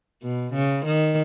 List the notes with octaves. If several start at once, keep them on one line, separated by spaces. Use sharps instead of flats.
B2
C#3
D#3